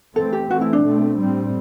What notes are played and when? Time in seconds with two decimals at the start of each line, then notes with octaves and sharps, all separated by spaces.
0.15 E3 A3 C4 A4
0.33 G4
0.49 E3 A3 C4 F#4
0.61 E4
0.73 D4
0.84 B2 A3 C4
1.19 A2 G3 C4